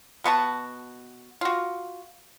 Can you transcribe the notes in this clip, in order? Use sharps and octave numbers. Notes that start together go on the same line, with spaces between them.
B2 B3 F#4 A5
F4 F#4